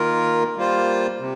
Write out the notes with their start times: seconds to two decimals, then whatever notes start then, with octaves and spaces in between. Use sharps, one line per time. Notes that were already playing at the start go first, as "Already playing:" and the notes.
Already playing: D#3 A#3 F4 A#4
0.56 G3 A#3 F4 C5
1.19 C3